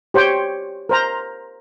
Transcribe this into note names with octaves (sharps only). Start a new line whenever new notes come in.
G4 C5 C#5 G5
A#4 C5 A#5